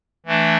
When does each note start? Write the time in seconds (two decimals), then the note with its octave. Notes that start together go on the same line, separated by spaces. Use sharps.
0.26 E3 A3 D4